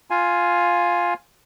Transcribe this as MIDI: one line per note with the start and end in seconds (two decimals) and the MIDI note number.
0.10 1.14 65
0.10 1.14 77
0.10 1.14 80